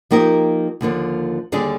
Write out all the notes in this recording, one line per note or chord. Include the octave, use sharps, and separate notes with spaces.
F3 A#3 D#4 G4 A#4
D#2 D3 F3 A#3
D#2 D3 G3 D4 G#4